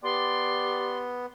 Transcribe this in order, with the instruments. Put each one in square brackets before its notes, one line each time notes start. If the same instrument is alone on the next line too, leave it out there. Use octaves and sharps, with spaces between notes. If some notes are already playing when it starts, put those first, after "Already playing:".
[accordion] B3 [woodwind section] G4 D5 [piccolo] C6